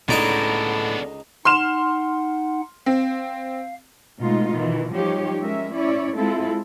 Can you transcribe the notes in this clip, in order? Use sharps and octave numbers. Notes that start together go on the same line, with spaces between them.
C#2 A2 D3 B3 D4 D#4 D#5
D#4 F#5 C6 F6 E7
C4 F5
B2 G#3 A3 D#4 F4
B2 D#3 E3
F3 G3 D#4 G4 C#5
G#3 C#4 A#4 E5
C#4 E4 C#5 D5
G#3 C4 E4 F4 A4